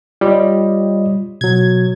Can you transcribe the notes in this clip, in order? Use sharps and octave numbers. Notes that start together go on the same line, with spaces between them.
G3 F4 C#5 D#5
B2 F#3 G#6